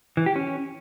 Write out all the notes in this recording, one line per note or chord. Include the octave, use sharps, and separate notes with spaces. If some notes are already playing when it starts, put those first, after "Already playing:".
E3
G4
C#4